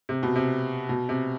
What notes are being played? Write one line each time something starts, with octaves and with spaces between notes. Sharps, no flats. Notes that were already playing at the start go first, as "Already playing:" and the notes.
C3
B2
C3
B2
C3